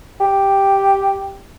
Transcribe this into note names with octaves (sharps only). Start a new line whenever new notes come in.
G4